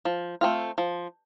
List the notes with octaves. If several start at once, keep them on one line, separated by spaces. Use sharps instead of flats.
F3
A3 C4 F4
F3